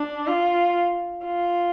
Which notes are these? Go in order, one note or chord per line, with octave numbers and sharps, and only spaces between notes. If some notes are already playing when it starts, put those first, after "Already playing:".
Already playing: D4
F4
F4